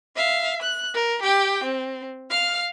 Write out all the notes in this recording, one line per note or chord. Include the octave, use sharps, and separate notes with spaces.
E5 F5
F#6
A#4
G4 G5
C4
F5 F6